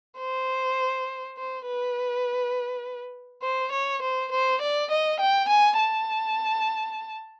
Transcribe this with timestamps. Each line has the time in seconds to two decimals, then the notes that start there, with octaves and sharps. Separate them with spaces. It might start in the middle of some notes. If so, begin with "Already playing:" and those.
0.19 C5
1.37 C5
1.66 B4
3.43 C5
3.72 C#5
4.02 C5
4.31 C5
4.61 D5
4.91 D#5
5.20 G5
5.48 G#5
5.79 A5